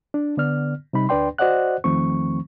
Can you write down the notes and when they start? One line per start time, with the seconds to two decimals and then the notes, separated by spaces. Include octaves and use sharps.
0.14 D4
0.37 D3 B3 D5 F6
0.93 C3 G3 D#4 B5
1.09 D2 D4 B4 D5 G5 C6
1.38 F#4 C5 D5 D#5 F#5 F#6
1.84 E2 D#3 F3 A3 C4 C#6